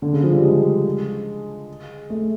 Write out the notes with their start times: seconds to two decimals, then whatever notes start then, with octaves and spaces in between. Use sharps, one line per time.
0.02 D3
0.13 C#3
0.23 F3
0.33 G3
0.43 G#3
2.10 A3